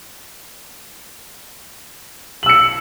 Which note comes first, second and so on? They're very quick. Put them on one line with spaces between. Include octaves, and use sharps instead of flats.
F#7 E6 C#7